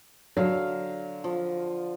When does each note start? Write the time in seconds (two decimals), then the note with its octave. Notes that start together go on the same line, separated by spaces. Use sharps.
0.37 D3 F#3 F5
1.24 F3